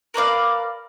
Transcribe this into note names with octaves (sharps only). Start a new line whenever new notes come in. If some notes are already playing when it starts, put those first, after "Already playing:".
A#4 B4 D5 F5